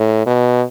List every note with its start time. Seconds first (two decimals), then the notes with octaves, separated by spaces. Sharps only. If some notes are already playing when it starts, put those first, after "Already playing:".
Already playing: A2
0.26 B2